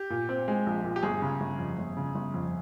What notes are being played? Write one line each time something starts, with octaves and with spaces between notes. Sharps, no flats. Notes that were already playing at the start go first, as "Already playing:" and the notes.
Already playing: G4
A#2
C4
G#3
A#1
A#2
G4
G1 G#4
C#3
G1
F2
G1
C#3
G1
F2